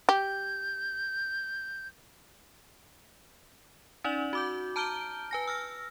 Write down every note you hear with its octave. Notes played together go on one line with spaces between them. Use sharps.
G4 G6
C#4 D#4 D5 F#7
F#4 D6 G6
A5 A#5 F6 G6 D7 G7
B4 G#5 A#6
E6 F6 A#6